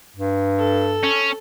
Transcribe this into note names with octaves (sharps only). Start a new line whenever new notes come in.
G2
A4
C#4